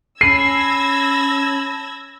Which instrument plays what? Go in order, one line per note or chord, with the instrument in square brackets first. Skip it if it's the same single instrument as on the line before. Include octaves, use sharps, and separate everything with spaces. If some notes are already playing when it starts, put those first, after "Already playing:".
[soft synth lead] C#4 [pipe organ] A5 B5 [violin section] E6 G#6 A#6 [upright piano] C7 D#7